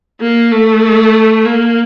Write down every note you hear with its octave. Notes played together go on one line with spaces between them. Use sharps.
A#3
A3
A#3